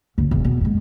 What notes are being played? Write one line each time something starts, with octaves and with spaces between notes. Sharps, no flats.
F#1 D2
E1
B2
F#2 G#3